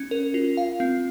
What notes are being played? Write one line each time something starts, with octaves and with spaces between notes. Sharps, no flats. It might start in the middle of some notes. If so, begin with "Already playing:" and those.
Already playing: C#4
A#4
F4
F5
C4